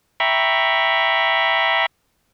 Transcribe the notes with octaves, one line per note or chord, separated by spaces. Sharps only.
E5 G5 A#5 B5 C#6